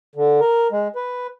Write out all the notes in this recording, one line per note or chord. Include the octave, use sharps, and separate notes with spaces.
D3
A#4
G#3
B4